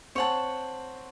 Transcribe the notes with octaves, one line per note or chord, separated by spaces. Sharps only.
C4 C#5 F#5 A5